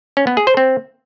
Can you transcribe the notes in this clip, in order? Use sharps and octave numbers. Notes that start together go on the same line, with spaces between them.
C#4
B3
G#4
C5
C4